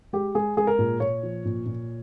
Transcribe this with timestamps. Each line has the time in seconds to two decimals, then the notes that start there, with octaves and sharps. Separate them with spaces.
0.13 G#3 G4
0.35 G#3 G#4
0.57 G#3 G#4
0.67 A#4
0.79 A#2
1.00 A#2 C#5
1.23 F3
1.45 A#2
1.66 A#2